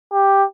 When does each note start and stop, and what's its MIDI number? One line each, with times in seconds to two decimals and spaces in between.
0.13 0.45 67